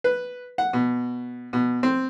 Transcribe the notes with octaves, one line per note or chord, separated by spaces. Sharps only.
B4
F#5
B2
B2
C4